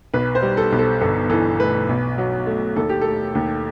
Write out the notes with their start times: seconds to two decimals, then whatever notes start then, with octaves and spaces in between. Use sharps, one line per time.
0.13 B1 B4
0.35 C5
0.42 G3
0.57 A4
0.72 B1
0.79 A4
1.01 G1 A4
1.30 E3 A4
1.59 A3 B4
1.89 B1
2.18 F#3
2.46 A3
2.76 D#2 A4
2.89 G4
3.02 A3 A4
3.35 D#2